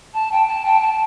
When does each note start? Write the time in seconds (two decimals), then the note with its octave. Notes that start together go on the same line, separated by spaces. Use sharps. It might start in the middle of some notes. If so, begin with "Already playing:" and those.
0.14 A5
0.32 G5
0.48 A5
0.65 G5
0.82 A5